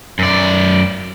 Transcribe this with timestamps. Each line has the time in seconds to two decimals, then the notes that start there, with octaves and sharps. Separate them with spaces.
0.19 F#2 D5